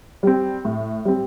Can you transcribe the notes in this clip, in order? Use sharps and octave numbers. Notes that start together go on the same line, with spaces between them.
G3 C4
A2
G3 C4